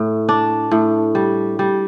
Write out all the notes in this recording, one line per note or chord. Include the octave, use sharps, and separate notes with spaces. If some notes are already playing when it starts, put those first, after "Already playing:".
Already playing: A2
D4
A2
G3
G3